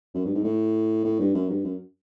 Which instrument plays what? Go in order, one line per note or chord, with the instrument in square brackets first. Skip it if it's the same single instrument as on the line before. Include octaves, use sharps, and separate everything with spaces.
[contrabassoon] F#2
G2
G#2
A2
A2
G2
F#2
G2
F#2